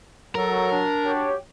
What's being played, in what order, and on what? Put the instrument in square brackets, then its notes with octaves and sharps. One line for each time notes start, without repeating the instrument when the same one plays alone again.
[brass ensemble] F#3 [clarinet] A4 [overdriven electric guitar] A#4
[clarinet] D4
[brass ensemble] F#4 G4 C#5